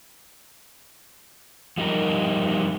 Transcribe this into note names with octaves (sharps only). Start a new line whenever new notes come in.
F3 G3 D#4 G4 A#4